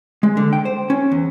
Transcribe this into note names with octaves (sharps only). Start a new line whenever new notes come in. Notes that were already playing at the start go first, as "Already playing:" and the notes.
G#3
D3
G5
C5
C#4
E2